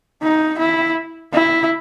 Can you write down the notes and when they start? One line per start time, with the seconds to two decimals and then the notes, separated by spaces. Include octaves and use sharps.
0.23 D#4
0.59 E4
1.33 E4